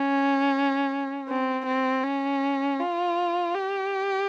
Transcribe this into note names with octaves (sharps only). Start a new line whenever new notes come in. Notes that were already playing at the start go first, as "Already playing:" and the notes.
Already playing: C#4
C4
C4
C#4
F4
G4